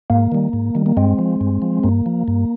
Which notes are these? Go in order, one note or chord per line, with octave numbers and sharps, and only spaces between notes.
G#2 A#3
D#3 G3
G#2
D#3 G3
A#3
G2 G#3 C4
F3
G2
F3
G2 A#3
F3
G2